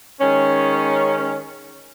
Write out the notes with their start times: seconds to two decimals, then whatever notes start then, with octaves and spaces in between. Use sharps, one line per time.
0.20 D#3 G#3 C#4